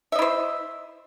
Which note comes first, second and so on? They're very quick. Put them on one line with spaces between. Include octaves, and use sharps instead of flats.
E5 D#5 E4 C5